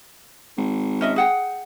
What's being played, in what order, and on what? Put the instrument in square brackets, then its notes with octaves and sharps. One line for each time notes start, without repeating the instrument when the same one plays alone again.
[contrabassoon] G#1
[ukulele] C#4 D#5 E5
G#4 F#5 G5